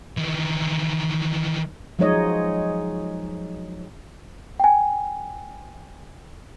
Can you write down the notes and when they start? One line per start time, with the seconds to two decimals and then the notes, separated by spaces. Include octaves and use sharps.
0.17 D#3 E3
1.99 F3 F#3 G#3 D#4 C#5 D#5
4.60 G5 G#5